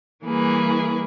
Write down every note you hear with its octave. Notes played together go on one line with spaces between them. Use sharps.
E3 G3 A#3 G#4 B4